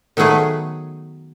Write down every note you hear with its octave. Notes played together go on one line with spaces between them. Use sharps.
D#3 F#3 A3 B3 G#4 F#5